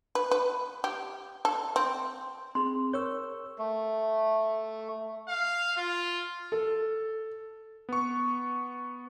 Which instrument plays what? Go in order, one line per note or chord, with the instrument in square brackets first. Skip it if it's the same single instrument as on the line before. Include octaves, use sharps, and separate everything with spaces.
[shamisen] B4
B4
G4
A4
C4
[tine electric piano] C4 G#4 [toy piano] C6
[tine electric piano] A#4 C#6 E6 [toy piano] C#5
[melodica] A3
[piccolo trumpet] F5
F4
[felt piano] A4
[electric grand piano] B3 C#6